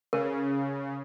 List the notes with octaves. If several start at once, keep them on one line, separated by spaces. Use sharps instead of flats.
C#3 A#4